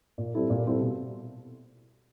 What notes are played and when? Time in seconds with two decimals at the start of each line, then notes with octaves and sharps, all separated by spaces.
0.18 A#2
0.34 G3 C4 E4 A4
0.50 A#2
0.65 G3 C4 E4 A4
0.81 B2